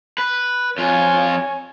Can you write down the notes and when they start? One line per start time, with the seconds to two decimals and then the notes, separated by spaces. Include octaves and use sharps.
0.18 B4
0.78 F2 F4 C#5 G#5